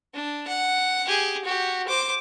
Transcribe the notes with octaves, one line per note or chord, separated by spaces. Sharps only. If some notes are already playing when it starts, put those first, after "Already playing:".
D4
F#5
G4 G#4
F#4 G4
C5 D6